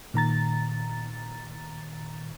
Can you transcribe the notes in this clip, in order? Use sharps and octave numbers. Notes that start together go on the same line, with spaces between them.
A#2 D#3 A#5 A6